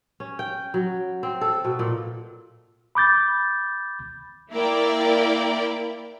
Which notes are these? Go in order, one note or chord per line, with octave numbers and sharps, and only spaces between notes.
C#4
G5
F#3
C4
A4
B2
A#2
B5 D6 G6 A6
A#3 E4 A#4 D5 G5